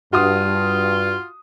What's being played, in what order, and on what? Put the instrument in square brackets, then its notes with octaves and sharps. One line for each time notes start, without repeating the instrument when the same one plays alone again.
[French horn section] G2 [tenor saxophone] F4 [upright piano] F#4 C6 D#6